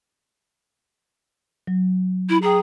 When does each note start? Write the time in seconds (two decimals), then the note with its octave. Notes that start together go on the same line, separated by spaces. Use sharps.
1.67 F#3
2.29 E4
2.42 G#4 G5 A#5